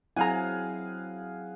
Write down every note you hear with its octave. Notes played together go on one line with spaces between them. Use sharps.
F#3 C4 E4 G#4 F5 F#5 G#5 A#5